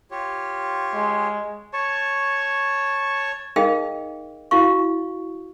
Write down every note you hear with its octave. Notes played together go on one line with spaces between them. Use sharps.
F4 G4 C#5
G#3
C#5 A5 C#6
D#4 G#4 A#4 D#5 F5 G5
E4 F#4 F5 C#6